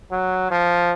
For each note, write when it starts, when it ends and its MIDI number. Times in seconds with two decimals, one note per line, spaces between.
0.11 0.49 54
0.51 0.92 53